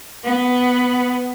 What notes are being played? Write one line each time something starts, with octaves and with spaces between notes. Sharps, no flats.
B3